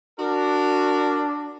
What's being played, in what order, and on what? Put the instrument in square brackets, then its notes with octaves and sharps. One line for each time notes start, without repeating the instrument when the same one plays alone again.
[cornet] D4 [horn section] F#4 A#4